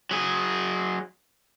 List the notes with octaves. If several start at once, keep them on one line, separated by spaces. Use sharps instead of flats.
F#3 G#4